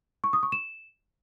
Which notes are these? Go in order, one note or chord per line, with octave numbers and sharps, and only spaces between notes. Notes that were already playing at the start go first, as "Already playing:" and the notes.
C#6
D#6
C#6
E7